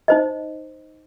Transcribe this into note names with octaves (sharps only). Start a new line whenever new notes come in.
D#4 C5 D#5